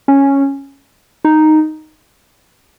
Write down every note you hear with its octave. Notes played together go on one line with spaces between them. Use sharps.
C#4
D#4